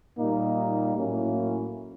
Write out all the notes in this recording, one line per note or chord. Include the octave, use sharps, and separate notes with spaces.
A#2 G3 A#3 D#4
A2 F#3 A#3 C#4 E4